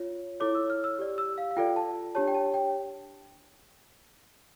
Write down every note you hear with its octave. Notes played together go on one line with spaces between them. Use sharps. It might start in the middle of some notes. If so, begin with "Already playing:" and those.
Already playing: F4 C#5
E4 A4 C#5 D6
E6
F6
E6
G4 D5
E6
F5
F5
F4 A4 D5 G5
A5
D4 G4 C#5 A5
G5
A5
G5